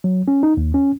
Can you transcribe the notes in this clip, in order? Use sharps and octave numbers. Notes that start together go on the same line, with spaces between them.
F#3
C#4
D#4
D#2
C#4